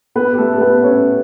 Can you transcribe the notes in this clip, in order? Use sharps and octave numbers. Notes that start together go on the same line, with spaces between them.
B3 B4
G4
A3 A4
A4
B3 B4
C#4 C#5